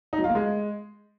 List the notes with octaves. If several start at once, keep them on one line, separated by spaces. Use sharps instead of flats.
D#4
F#3
F4
A#3
G#3